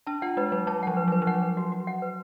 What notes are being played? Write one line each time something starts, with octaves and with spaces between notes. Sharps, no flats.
D4 A5
F4 F#5
G#3 B4
F#3 B4
F#3 A5
F3 F#5
B4
F#3 B4
F3
F#3 F#5
B4
F#4
F#4
F#5
B4